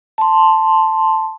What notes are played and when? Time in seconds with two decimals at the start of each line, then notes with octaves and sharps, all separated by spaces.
0.18 A5 C6